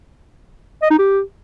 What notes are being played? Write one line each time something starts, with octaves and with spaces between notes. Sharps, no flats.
D#5
D#4
G4